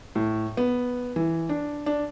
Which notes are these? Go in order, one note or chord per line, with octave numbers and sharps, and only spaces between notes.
A2
B3
E3
D4
D4